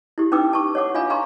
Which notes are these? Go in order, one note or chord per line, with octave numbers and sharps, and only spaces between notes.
E4 G4
C#4 D#4 B4 G5 D6 E6
A5 C#6
C#5 F#5 D6
D4 F4 F5 G#5 B5
F5 G#5 A#5 C6 C#6